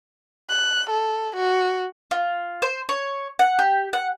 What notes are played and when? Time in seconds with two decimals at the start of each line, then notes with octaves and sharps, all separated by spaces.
0.49 F#6
0.90 A4
1.36 F#4
2.11 F4
2.62 C5
2.89 C#5
3.39 F#5
3.59 G4
3.93 F#5